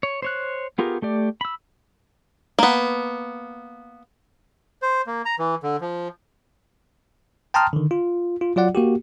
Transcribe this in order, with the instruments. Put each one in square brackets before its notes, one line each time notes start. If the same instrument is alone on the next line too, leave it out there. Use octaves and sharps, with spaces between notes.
[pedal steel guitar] C#5
C5 C#5 F#6
B3 F4 G4 G#4 A#4
A3 G4 D5
B5 E6
[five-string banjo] A#3 B3
[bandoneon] C5
A#3
A#5
E3
D3
F3
[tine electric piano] G5 A5 A#5 C6 D#6 F6
D3 D#3
F4
F4
F#3 F4 D5 F#5
A#3 F#4 G4